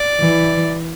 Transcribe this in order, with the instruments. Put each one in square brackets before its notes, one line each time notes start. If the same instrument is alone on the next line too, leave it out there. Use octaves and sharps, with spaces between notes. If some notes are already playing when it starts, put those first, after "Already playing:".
Already playing: [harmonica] D5
[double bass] E3